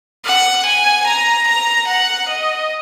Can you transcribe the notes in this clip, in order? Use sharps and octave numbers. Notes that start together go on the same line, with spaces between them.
F#5
G#5
A#5
A#5
F#5
D#5